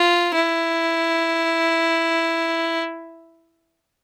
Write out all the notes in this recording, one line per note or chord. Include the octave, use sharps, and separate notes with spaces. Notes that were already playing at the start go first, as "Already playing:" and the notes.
Already playing: F4
E4